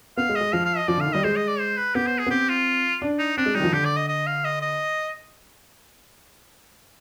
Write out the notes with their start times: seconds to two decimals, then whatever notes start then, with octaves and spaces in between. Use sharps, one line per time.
0.17 B3 F5
0.29 G#3
0.35 D#5
0.41 G#3
0.53 F3 F5
0.65 F5
0.77 D#5
0.88 F3 D5
0.98 D3
1.00 F5
1.06 D#3
1.13 G3 D#5
1.23 G#3 C5
1.36 D#5
1.48 D5
1.59 C5
1.77 B4
1.95 B3 G4
2.07 C5
2.19 G#4
2.26 B3
2.30 C4 G4
2.49 F4
3.02 D4
3.19 D#4
3.37 C4 D4
3.46 G#3
3.55 D#3 G3 D#4
3.64 F3
3.73 D3 G4
3.85 D5
3.96 D#5
4.08 D#5
4.27 F5
4.44 D#5
4.61 D#5